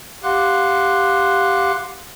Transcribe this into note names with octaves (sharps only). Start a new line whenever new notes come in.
G4 F5 F#5 C6 D6 F#6